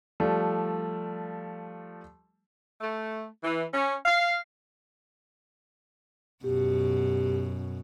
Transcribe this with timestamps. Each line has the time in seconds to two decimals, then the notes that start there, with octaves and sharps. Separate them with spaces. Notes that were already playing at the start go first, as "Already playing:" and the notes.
0.20 F3 G3 A3
2.81 A3
3.43 E3
3.74 C#4
4.06 F5
6.44 F#2 B2 G4